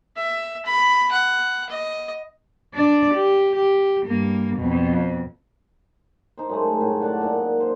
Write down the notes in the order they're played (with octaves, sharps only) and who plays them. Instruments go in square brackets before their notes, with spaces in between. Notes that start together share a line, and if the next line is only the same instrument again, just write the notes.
[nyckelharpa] E5
B5
F#5
D#5
[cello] D4 D5
G4
G4
G2 A#3
F2 B2
[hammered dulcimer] D#4 C5
F#2 G#3 A3
A2
D3 F#5 A5 D6
A#2 D#4 D5
C5